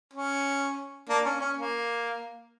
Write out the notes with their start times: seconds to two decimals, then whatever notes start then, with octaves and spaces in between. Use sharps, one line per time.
0.13 C#4
1.09 A#3 D4
1.25 C#4
1.41 C#4
1.57 A#3